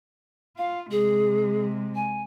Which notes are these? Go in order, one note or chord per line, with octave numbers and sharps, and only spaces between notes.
F4 F5
C3 G#3 G#4
G#5